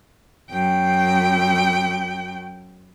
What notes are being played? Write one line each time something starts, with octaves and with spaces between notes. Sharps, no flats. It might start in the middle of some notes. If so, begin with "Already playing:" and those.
F#2 G5